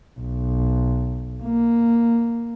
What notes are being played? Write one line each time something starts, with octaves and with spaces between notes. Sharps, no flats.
B1
A#3